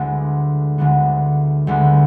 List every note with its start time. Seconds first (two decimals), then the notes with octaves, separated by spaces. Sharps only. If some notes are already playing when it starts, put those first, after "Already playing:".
Already playing: D2 D3 G#3 B3 D4
0.78 D2 D3 G#3 B3 D4
1.67 D2 D3 G#3 B3 D4